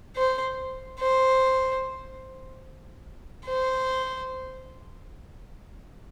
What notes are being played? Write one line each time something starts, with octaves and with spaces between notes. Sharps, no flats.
C5
C5
C5